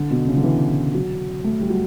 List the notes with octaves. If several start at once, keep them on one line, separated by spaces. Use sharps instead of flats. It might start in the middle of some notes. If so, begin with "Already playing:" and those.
Already playing: D3
B2
C#3
D3
E3
F#3
A3
G3
F#3